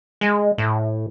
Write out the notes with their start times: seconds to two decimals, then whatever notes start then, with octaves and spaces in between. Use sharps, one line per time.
0.21 G#3
0.58 A2